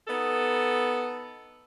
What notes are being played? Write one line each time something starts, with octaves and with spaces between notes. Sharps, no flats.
B3 D#4 A4